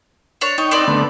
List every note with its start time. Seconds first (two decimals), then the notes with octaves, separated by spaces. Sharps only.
0.41 D4 C#5
0.58 D#4 C#5 G5
0.71 C4 B4 D5
0.88 D3 A3 B3